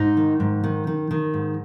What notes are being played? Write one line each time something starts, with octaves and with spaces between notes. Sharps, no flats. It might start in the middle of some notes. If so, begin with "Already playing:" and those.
Already playing: G#2 D#4
D#3
G#2
D#3
D#3
D#3
G#2